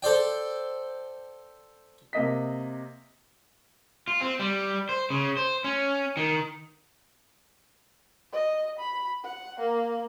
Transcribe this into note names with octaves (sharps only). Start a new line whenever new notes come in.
A4 C5 D5 G5
C3 A#3 D#5 B6
F4
C4
G3
C5
C#3
C5
C#4
D#3
D#5
B5
F#5
A#3